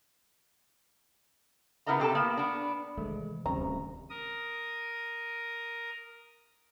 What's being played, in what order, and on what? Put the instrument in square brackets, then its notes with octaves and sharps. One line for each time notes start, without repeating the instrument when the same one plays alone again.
[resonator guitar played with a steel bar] C#3 B3 E4 A#4 D#5 A#5
C3 G4 A4 A5
A#3 B3
B3 D4
[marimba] C3 D#3 [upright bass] E3 [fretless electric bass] G#3 A3
[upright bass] D1 [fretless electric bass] G2 C3 [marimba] C#4 C5 [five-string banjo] A#5
[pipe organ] A#4 D#6